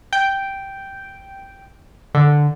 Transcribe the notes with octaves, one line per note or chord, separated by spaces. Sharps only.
G5
D3